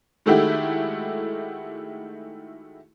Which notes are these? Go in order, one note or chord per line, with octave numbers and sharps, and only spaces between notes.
D#3 G#3 A3 E4 F#4 G4